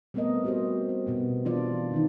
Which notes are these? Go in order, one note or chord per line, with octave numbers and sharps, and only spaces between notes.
G3 A3 B3 C4 A#4 D#5
F#4 G4 C5
G4
B2 B3 C4
E3 D4 F4 D5
D#3 C4 D#4